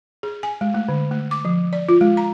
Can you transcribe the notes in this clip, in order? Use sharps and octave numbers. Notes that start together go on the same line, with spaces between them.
G#4
G#5
G#3
A3
D3
A3
D6
F3
D5
F4
G#3
A#5